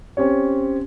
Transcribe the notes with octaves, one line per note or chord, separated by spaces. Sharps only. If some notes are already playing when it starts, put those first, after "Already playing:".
C4 C#4 G4 C#5